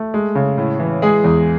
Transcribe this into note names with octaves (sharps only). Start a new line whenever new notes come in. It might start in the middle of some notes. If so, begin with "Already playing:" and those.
Already playing: A3
G#3
C#3
A2
E3
G#3 G#4
E2